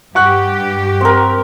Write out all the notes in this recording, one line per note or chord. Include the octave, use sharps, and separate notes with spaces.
G2 G4 F#5 C#6 F#6
C4 A#4